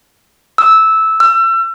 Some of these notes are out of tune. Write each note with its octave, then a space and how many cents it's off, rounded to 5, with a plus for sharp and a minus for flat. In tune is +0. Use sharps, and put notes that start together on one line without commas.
E6 -10
E6 +35